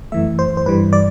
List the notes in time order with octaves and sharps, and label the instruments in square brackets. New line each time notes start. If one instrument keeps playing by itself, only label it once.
[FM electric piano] F#2 E3 A3 E5
C5
C5
G2 E3 G3 B4
D5